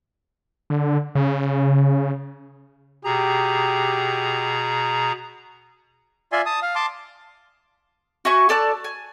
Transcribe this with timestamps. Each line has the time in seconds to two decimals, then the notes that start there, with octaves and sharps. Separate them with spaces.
0.70 D3
1.15 C#3
3.05 B2 G4 G#4 A#5
6.32 F4 D5 E5 G#5 C6
6.46 A5 D#6
6.62 F5
6.75 A5 C6 D6
8.25 F#4 E5 G#5 C#6
8.49 A4 D5 A5 F#6
8.84 G#5